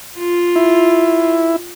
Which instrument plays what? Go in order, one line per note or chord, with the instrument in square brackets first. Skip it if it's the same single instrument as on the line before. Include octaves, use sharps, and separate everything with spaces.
[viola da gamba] F4
[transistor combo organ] E4